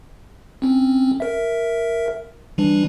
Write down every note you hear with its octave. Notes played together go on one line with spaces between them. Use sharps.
C4 C#4
A#4 E5
E3 G3 D4